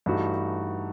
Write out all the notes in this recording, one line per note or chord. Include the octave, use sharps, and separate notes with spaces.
G2 E3 A3 D#4 F#4